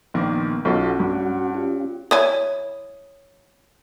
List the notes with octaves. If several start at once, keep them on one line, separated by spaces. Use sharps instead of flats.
A#1 D#3 A#3 B3
B1 C#4 F4 F#4 A4 F#5
G2
C#4 F4 G4
E3 E4 C#5 G#5 D#6